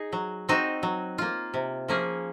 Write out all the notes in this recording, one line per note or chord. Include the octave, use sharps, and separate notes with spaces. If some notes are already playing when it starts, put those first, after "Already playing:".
Already playing: D#4 G#4
F#3
C4 D#4 F#4 C5
F#3
A#3 F4
C3
F3 A#3 C#4 G#4